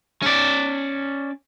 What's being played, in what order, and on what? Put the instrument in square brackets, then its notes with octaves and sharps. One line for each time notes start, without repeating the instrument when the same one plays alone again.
[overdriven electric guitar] C#4 D5